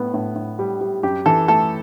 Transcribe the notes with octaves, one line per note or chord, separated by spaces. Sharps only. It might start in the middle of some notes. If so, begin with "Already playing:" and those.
Already playing: A2 B3
A2
A2
G3
G3
F#2 G4
E3 A4
A3 A4